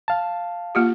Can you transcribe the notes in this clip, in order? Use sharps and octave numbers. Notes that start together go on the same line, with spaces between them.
F5 A5
A#3 F4 G4